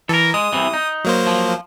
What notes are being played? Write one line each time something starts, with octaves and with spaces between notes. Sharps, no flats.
E3 A4 A#4
G#3 D#6
C2 C3 E3
D#4
F#3 A#3 C5
F3